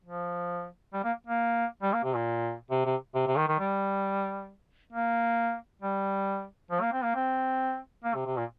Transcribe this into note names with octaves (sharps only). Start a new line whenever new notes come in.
F3
G3
A#3
A#3
G3
A#3
C3
A#2
C3
C3
C3
C3
D#3
D#3
G3
A#3
G3
F3
A#3
C4
A#3
C4
A#3
C3
C3
A#2